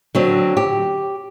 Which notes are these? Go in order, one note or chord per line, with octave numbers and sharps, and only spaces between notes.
D3 F#3 C4
G4